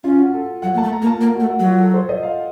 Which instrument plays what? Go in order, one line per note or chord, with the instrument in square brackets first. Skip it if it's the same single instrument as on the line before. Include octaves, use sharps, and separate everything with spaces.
[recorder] C#4 [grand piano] F4
[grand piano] F#4
A4
[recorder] F#3 [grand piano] F#5
[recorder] A#3
[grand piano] A5
[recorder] A3
[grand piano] A#5
[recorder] A#3
[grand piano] A5
[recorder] A#3 [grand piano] A#4
[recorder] A3 [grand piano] F#4
[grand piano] F#4
[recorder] F#3
[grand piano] F4
A4
C5
D#5
F5